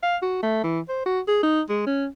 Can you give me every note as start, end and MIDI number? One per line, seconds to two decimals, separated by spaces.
0.03 0.17 77
0.22 0.39 66
0.43 0.62 57
0.64 0.80 52
0.89 1.02 72
1.06 1.21 66
1.28 1.41 68
1.43 1.61 63
1.69 1.82 56
1.87 2.07 61